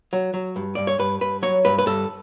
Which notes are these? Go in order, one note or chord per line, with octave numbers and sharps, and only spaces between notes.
F#3
F#3
G2
G2 D5
C#5
G2 B4
G2 B4
F#3 C#5
G2 B4
B4
G2 A4